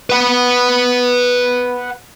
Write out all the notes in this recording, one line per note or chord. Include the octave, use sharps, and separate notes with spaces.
B4 F#5